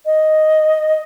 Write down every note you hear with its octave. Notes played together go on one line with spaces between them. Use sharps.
D#5